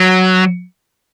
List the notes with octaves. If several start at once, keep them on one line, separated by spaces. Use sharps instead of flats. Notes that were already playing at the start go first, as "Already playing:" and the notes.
Already playing: F#3